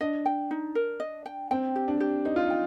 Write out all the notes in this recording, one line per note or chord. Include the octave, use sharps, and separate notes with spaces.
D4 D#5
G5
D#4
A#4
D#5
G5
C4 G5
G4
D4
G4
D#4 C5
F4
D#4 G5